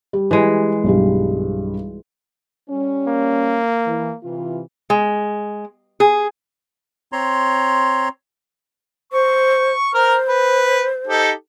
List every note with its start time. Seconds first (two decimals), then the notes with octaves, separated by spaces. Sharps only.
0.13 G3
0.31 E3 G#3
0.84 B1 G2 G3
2.70 G3 C#4
3.08 A#3
3.87 E3
4.23 C3 E3 F4
4.90 G#3
6.00 G#4
7.12 C4 C#5 A#5 C6
9.13 C5 C#6
9.94 A#4 C5 A#5 F6
10.28 B4
11.07 D#4 G4 A4